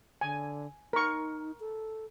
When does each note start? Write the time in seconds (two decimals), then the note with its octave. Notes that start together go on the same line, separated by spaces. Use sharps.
0.21 D3 G#5
0.93 D#4 A#4 C#6
1.60 A4